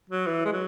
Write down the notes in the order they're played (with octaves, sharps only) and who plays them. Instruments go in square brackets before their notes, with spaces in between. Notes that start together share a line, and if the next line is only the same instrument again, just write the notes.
[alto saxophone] F#3
E3
G#3
F#3